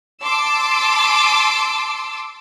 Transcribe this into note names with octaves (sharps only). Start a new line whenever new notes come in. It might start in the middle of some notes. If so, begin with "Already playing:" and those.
A5 C6 D6 E6